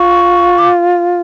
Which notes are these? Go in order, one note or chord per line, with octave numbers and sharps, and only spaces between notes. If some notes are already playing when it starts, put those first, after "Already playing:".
Already playing: F4 C#6
D6